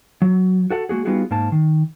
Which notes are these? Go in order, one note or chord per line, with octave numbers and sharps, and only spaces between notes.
F#3
F#4 A4 F#5
G#3 A#3 F#4 G#4
G3 B3 D#4 F4 F#4 G#4
G#2 A#3 A5
D#3